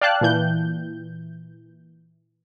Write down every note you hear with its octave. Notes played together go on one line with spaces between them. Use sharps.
D5 F5 G5 A5 F#6
A#2 E3 G6